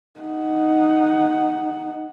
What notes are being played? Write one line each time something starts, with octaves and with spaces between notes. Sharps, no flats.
D#4 F#5